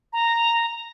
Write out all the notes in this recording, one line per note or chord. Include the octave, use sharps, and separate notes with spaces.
A#5